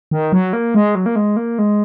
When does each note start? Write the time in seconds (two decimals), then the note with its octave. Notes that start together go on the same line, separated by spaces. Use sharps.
0.11 D#3
0.32 F#3
0.53 A#3
0.74 G#3
0.95 F#3
1.06 A#3
1.16 G#3
1.37 A#3
1.59 G#3